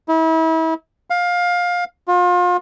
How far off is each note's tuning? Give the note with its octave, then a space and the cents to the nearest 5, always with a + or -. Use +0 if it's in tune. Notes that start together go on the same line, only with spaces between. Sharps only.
E4 -35
F5 +20
F4 +35